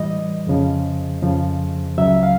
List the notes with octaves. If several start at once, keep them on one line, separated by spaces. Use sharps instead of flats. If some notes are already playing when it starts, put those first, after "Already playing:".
Already playing: A2 E3 G3 D#5
F2 C#3 F3
F2 C#3 F3
C#2 C#3 F#3 E5
F5